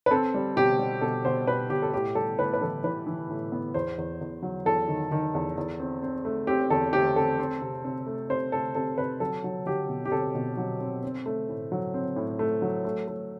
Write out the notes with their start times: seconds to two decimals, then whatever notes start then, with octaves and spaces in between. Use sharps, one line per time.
0.06 B4
0.11 C4 A4
0.34 G3
0.56 B2 G4
0.79 G3
1.01 B2 A4
1.25 B2 C5
1.47 B2 B4
1.70 B2 G4
1.82 A4
1.93 A2 G4
2.15 G3 A4
2.39 A2 B4
2.53 B4
2.61 E3 A4
2.84 E3 B4
3.07 E3
3.29 A2
3.52 B3
3.74 E2 C5
3.98 E2
4.21 E2
4.43 F#3
4.65 E2 A4
4.88 D#3
5.12 D#3
5.35 E2
5.58 E2
5.80 C4
6.03 C4
6.25 A3
6.47 C4 G4
6.70 E2 A4
6.93 A3 G4
7.16 C4 A4
7.39 C4
7.62 C3
7.84 C4
8.07 A3
8.30 C3 C5
8.52 A3 A4
8.75 C3 A4
8.98 C3 B4
9.20 F#3 A4
9.44 F#3
9.66 F#3 G4
9.89 B2
10.05 G4
10.11 C4 A4
10.35 B2
10.57 F#3
10.80 C4
11.03 C4
11.26 A3
11.49 A2
11.72 F#3
11.94 C4
12.16 A2
12.39 A3
12.62 F#3
12.85 A3
13.07 A3